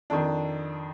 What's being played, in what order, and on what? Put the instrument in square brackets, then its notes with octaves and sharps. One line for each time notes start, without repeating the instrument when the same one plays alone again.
[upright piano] F2 D#3 D4